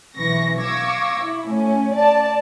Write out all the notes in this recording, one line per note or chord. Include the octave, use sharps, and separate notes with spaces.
B1 E3 C#6 A#6
F5 C#6 D6 E6 G#6 A#6
E4
A2 C#4
D5 A5